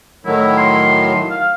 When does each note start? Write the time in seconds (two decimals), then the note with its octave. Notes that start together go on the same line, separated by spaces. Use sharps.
0.25 A2 D#3 F#3 E4
0.58 C6
1.30 F5